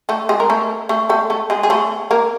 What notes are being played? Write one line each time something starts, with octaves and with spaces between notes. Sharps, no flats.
A3 A4
G#3 G#4
A#4
A3 A4
A3 A4
A3 A4
A3 A4
G#3 G#4
G#4
A3 A4
A#3 A#4